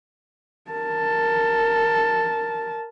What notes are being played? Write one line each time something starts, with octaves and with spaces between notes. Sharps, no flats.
A#4 A5